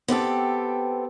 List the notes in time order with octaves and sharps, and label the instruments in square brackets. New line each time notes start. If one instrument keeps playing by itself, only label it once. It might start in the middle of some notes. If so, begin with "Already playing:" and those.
[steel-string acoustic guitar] B3 C4 G4 A4